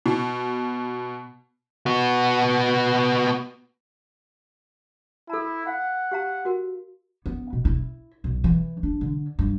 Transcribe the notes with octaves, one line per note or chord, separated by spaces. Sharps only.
B2
B3 F#4
E4 A4 A#5
F5 F#5
G4 F5 A#5
F#4 A#4
B3
B2
E4
B1
E3
D4
D3
G2